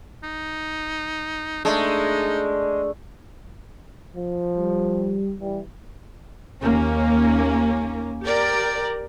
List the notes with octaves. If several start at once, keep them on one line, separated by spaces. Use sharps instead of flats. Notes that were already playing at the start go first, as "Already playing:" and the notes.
D#4
G#3 A3 D4 D#4
F3
G3
E3 G3
D#2 A#3 C#4
G4 A#4 D5